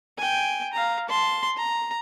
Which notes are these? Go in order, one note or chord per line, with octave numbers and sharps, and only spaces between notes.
G5 G#5
F5 A#5
A5 C6
A#5